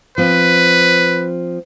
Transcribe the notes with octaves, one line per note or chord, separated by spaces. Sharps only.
F3 C4 B4